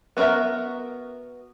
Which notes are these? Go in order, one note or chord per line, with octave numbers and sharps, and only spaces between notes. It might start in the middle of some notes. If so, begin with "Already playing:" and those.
B3 F#4 G#4 A#4 E5